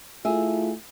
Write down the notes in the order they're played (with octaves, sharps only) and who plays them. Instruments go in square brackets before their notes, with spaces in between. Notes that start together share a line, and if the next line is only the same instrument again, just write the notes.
[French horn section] A3 E4 F4 [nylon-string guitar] G#4 E5